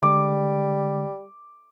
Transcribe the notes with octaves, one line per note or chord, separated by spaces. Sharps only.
D3 G3 G#3 D6